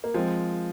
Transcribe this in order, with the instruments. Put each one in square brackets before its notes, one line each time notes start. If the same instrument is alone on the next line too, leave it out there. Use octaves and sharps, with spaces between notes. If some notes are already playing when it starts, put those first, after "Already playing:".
[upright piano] A#3
[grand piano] F3 [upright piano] G#3 C4